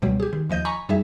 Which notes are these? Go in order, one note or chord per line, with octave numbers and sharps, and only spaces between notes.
C#2 B2 F#3 G3
G4 G#4
D#3
D#2 F3 D#5 G6
G#5 A#5 B5 C#6
F#2 G3 D#4 G#4 E5